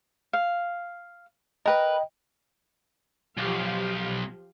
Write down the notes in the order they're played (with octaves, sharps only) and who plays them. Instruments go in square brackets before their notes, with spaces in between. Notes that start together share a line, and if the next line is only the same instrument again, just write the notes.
[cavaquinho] F5
[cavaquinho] A#4 B4 B5 [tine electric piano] D#5 G5
[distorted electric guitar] B1 [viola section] F3 G4 F5